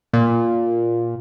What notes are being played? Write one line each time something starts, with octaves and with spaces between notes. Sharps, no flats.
A#2